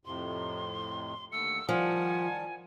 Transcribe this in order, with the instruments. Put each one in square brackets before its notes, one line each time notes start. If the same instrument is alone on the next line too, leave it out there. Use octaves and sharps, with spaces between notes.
[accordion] F2 A2 C3 [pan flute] C6
[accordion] D#2 D3 A3 [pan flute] E6 [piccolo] C#7
[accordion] D#3 G3 A5 [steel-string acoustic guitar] F3 [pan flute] F#5 [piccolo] G#5